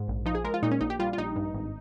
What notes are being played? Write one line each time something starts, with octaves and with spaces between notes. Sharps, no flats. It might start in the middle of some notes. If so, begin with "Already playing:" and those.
Already playing: G#2
A#1
F3 D#4
G#4
G#3 A#4
F4
A#2 D#4
C#4
A#1 D#4
G4
G3 F4
F4
A#1 D#4
G2
G#1